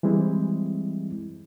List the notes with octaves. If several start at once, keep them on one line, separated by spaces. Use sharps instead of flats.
E3 G3 G#3 C4 E4